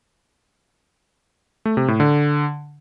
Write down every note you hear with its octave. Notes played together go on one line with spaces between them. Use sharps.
A3
C3
A2
D3